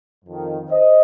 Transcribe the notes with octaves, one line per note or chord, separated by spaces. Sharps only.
F2 D#3
C5 D#5